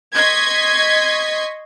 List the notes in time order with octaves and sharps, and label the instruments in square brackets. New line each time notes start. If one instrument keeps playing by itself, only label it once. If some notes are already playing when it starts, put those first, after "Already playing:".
[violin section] D#5 C6 C#6 G#6 B6